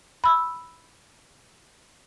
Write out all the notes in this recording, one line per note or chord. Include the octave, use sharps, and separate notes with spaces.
B5 E6